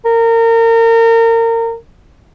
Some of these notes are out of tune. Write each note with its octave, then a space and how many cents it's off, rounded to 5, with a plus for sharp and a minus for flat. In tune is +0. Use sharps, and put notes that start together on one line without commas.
A#4 -30